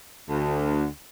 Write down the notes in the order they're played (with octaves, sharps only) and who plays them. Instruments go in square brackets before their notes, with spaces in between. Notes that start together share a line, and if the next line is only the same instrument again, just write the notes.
[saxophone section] D2